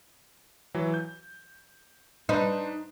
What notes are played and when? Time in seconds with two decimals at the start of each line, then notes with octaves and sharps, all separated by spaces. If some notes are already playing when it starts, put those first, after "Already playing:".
0.74 E3 F#3
0.94 G6
2.29 D4 D#4 B4 C5